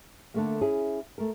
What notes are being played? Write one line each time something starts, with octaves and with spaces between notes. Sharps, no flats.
D3 A3 A#3
C#4 E4 G#4
A3 A#4